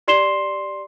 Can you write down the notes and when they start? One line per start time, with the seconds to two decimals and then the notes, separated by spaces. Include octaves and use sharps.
0.08 G4 D5 C6 C7 E7 G7